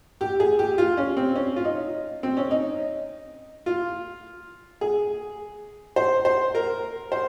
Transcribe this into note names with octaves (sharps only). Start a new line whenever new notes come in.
G4
G#4
G4
F4
C#4
C4
C#4
F4
D#4
C4
C#4
D#4
F4
G#4
C5
C5
A#4
C5